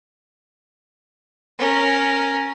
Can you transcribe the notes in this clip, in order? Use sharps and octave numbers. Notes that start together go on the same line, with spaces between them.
C#4 A#4